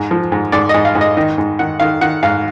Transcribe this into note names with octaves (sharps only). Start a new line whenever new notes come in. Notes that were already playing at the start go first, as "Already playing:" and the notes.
Already playing: G#2
F3
G#2
G#2 D5
G#2 D#5
F5
G#2
D#5
D#3 D#5
G#2
D#3 F#5
D#3 F5
D#3 F#5
G#2 F5